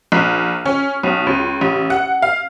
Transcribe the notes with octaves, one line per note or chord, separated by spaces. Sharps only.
A#1
C#4
B1
C#2
A1
F#5
F5